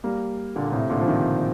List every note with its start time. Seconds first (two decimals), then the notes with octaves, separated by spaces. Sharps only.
0.04 G3 A#3
0.56 A#2 D3
0.72 A2 C3
0.90 A#2 D3
1.01 F3
1.08 C3 D#3